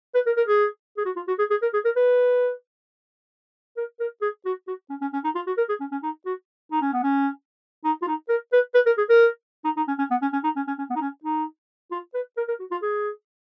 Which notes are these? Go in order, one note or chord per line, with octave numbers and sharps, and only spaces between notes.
B4
A#4
A#4
G#4
G#4
F#4
F4
F#4
G#4
G#4
A#4
G#4
A#4
B4
A#4
A#4
G#4
F#4
F#4
C#4
C#4
C#4
D#4
F4
F#4
A#4
G#4
C#4
C#4
D#4
F#4
D#4
C#4
B3
C#4
D#4
F4
D#4
A#4
B4
B4
A#4
G#4
A#4
D#4
D#4
C#4
C#4
B3
C#4
C#4
D#4
C#4
C#4
C#4
B3
D#4
C#4
D#4
F4
B4
A#4
A#4
F#4
F4
G#4